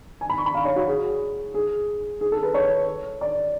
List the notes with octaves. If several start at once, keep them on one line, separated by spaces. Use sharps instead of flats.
G#5
B5
C#6
B5
F5
C#5
F#4
G#4
G#4
G#4
A4
B4
C#5
D5